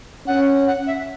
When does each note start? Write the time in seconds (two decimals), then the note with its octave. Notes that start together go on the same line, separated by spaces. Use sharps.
0.27 C#4 F#5
0.67 F#5
0.87 E5